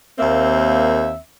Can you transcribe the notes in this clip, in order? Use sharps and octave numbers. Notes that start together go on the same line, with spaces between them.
D#2 A#3 C4 E5